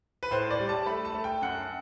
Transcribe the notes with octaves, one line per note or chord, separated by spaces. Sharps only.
B4
A2 C5
D5
G3
A5
A3 B5
A5
A3
G5
F#2 F#5